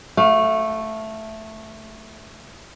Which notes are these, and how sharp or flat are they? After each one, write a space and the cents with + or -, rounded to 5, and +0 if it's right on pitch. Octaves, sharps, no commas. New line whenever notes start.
A3 +0 F5 +35